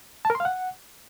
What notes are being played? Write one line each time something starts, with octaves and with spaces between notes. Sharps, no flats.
A5
A#4
C6
F5
F#5